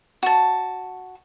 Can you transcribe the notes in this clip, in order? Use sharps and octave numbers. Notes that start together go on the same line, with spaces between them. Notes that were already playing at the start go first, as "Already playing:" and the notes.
F#4 A5